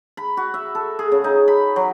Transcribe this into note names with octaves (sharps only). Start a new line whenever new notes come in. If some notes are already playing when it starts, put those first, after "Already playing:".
B5
F#4
E5
A4
G#4
C#3
D#4
B5
F#3